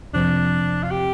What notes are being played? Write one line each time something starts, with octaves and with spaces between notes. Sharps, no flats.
F2 C3 F3 C4 D4
F4
G4